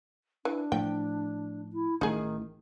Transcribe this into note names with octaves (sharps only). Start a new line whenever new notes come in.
E3 D4
A2 F3 G5
E4
A1 D#3 A3 D#4 G#4